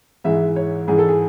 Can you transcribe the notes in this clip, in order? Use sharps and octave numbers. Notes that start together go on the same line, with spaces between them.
G#2 E3 G#3 E5
C#5
G#2 E3 G#3 G#4
A4
G#4